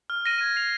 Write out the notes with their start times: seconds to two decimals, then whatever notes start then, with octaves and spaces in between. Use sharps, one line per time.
0.10 F6
0.26 A#6 D#7
0.41 G#6
0.56 C7 F7